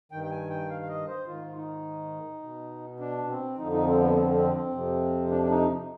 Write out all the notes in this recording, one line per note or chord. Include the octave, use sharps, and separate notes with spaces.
G2 D#3 G5
G5
G#5
G5
F5
F5
D#5
C5
G#2 D#3 F4
D#4
B2
D4
C4
F2 D3 F3 D#4
D#4
C4
B3
C4
C4
C4
F2 C3 F3
D4
D4
D#4